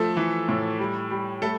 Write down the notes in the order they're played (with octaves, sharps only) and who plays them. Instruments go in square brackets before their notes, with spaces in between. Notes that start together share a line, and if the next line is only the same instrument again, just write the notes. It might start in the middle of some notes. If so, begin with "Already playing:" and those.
Already playing: [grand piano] F3 A3 A4
E3
A2
G3
G3
G3 A3 A4